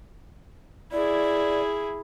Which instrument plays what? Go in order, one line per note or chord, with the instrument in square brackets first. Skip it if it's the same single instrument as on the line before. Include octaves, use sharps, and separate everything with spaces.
[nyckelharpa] E4 G#4 [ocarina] D5